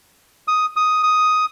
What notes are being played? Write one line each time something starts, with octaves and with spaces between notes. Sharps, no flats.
D#6
D#6
D#6